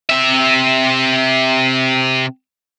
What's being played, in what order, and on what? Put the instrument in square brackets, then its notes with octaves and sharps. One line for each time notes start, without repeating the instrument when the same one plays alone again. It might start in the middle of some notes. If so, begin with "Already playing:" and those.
[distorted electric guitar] C3 E5